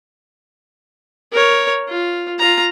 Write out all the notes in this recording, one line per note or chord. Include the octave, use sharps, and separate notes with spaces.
A#4 C#5
F4
F4 A#5